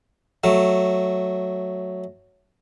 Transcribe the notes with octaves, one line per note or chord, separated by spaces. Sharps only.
F#3 A3